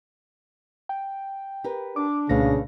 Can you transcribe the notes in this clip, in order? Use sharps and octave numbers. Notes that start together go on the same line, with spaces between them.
G5
G4 A#4 B4
D4 D6
C2 A#2 C#3 A3 B4 F5 A#6